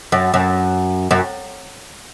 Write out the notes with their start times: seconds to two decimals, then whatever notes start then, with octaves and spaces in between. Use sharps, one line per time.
0.12 F#2
0.34 F#2
1.11 F#2